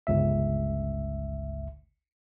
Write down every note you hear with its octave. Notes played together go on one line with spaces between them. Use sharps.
G1 C#2 E5